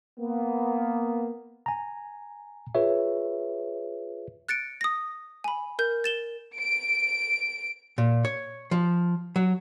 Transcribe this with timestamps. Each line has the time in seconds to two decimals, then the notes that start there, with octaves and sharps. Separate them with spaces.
0.19 A#3 B3
1.66 G#5 A#5
2.75 F4 G#4 B4 C#5 E5
4.49 F#6 A6 C#7 D7
4.81 D#6 A#6
5.44 G#5 B5
5.79 A#4 G6
6.04 A6 E7 G7
6.58 D7
7.98 A#2
8.25 C#5
8.71 F3
9.36 F#3